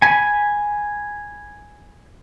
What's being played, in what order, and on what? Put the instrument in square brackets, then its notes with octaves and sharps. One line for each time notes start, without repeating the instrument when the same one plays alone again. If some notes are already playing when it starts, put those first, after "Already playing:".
[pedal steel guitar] G#5 B5